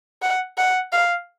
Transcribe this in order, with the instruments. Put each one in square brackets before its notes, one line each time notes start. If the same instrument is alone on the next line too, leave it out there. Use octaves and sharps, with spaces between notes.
[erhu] F#5
F#5
F5